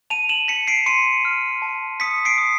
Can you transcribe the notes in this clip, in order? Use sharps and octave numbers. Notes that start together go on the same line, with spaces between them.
A5 D#7 F7
E7 F#7
A5 B6 C#7
C7 D7
C6 C#7 D#7
F6
A5
D#6 B6 C#7
C7 D7
D#6